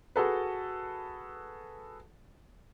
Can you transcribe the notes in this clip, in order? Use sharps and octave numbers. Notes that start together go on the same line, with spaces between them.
F#4 G#4 A4 B4